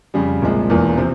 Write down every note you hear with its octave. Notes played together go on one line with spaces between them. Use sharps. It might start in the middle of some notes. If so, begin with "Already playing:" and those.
F2 C#3 G3
C2 A#2 F3 G#3
E1 E2 E3 A#3 F4
C3 F3 C4